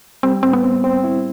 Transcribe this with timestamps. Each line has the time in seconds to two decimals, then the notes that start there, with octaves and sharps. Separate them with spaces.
0.23 G3 C4
0.43 A2 C4
0.53 B3
0.63 C4
0.84 C4
1.04 E4